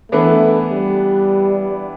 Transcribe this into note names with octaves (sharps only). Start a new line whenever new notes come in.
E3 A3 B3 D4
G3